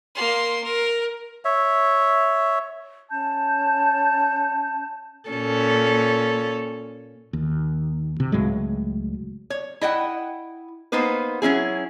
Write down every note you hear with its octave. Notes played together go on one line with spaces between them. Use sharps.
A#3 C6
A#4
C#5 E5
C#4 A5 G6
A#2 C#4 A4
D#2
C3
C#2 A2 F#3 G#3
C#5
E4 D#5 F#5 G5
A#3 B3 D#4 B4 C5
F#3 C#4 E4 G#4